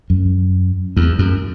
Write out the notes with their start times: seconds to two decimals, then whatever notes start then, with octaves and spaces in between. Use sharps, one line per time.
0.10 F#2
0.96 E2
1.19 F#2